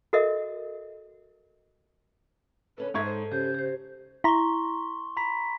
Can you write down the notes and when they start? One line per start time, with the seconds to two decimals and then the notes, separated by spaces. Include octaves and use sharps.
0.13 F#4 A4 A#4 D#5 E5
2.78 D3 C#4 A4 B4
2.94 G#2 A4 D#5 E5 C#6 G#6
3.06 C5
3.32 C#3 G4 C5 G6
3.54 G4 C5
4.24 E4 A#5 C6 C#6 G7
5.17 A#5 B5 B6